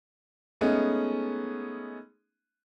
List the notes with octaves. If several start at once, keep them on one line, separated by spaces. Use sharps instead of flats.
G#3 A3 B3 C#4 D#4